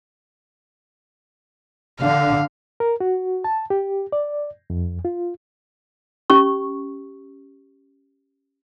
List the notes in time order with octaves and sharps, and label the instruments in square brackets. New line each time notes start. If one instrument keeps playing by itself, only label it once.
[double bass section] D3 [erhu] F5
[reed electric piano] A#4
F#4
A5
G4
D5
F2
F4
[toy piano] C#4 G4 C#6